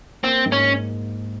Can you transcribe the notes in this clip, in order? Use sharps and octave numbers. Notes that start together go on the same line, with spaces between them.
A#3 C4
G#2
C#4